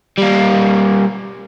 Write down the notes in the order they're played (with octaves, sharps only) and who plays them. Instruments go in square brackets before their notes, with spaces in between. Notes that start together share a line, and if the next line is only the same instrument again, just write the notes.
[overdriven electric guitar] G3 A#3